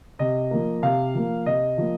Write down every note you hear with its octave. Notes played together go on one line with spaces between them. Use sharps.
C3 D#5
F3 A#3
C3 F5
F3 A#3
C3 D#5
F3 A#3